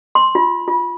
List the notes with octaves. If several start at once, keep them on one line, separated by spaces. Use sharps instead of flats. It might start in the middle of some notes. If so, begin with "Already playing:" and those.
C6
F4
F4